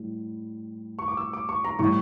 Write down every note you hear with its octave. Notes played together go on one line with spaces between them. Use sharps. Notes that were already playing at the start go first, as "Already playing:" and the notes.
Already playing: A2 G3
C#6
D6
E6
D6
C#6
A#5
A2 E3 G3 C#6